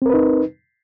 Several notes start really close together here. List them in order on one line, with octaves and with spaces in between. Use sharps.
C4 A#4 B4 D#4